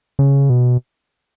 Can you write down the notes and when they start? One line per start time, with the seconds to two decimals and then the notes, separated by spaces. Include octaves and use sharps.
0.19 C#3
0.50 B2